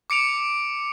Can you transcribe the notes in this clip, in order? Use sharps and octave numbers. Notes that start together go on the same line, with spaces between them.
D6 C#7 D7 F7